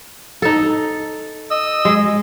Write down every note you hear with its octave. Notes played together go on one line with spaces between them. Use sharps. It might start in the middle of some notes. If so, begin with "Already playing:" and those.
D#4 A4
D#5 E6
G#3